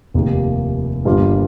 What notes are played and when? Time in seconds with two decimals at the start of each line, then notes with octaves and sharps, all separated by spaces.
0.14 F1 D#2 D#3 A#3 G4
1.05 G1 G2 G3 A#3 F4